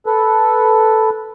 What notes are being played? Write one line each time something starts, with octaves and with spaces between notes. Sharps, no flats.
A4 B4